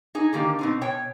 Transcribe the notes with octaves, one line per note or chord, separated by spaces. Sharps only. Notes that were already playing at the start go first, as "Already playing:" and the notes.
D#4 G#4
D3 D#3 A#3 G4
B2 C4 D#4
B2 C#5 G5